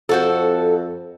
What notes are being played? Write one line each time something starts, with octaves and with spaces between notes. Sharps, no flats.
F2 C4 F#4 A4